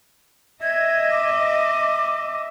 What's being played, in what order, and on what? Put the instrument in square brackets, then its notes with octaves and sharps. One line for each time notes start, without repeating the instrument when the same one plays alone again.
[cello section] D#5 [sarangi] E5 [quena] G#6
[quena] D6